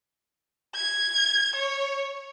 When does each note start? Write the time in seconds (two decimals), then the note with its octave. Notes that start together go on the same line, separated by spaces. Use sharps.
0.75 G#6
1.56 C#5